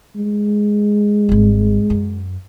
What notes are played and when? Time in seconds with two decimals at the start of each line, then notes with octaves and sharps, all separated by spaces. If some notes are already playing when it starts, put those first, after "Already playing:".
0.16 G#3
1.29 G#1 G3
1.90 F#2